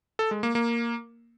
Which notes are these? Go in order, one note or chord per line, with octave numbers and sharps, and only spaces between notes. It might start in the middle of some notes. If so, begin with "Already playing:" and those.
A4
G#3
A#3
A#3